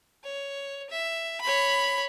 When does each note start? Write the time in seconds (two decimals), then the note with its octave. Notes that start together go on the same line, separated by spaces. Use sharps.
0.24 C#5
0.90 E5
1.41 C#5 B5